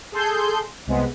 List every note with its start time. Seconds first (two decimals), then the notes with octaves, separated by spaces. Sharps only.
0.12 G#4 A4 C6 G6
0.87 C2 C3 G#3 B3